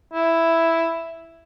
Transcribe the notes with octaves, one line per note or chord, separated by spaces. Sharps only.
E4